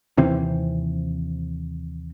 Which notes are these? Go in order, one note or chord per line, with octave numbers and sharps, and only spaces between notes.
D#2 C3 E3 C4